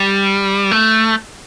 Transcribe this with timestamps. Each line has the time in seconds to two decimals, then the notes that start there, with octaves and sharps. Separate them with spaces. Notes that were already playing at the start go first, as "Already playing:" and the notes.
Already playing: G3
0.71 A3